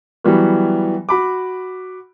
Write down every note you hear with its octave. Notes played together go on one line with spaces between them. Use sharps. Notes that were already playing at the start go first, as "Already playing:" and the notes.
E3 F#3 G3 B3
F#4 B5 D6